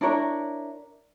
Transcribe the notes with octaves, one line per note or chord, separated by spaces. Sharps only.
D4 E4 A#4 C#5